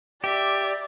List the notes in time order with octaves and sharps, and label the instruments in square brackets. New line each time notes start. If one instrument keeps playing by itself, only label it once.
[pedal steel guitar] G4 [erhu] D5 [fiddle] E5